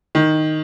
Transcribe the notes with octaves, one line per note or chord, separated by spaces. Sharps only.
D#3